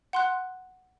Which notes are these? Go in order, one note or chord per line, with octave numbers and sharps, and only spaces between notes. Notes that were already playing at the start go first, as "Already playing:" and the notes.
F#5 C6 F#6